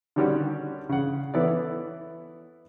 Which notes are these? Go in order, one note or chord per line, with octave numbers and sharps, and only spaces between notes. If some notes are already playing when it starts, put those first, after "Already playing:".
D3 D#3 G3 C#4 F#4 D5
C#3 F#5
E3 B3 E4 A4 C#5 D5